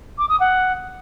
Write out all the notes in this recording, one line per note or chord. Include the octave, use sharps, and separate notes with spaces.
D6
D#6
F#5